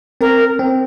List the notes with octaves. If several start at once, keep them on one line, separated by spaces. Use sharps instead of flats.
C4 A#4
C4